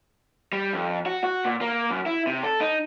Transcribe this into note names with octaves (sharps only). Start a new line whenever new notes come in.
G3
F2
F#4
F#4
A#2
A#3
F#2
E4
C3
A4
D#4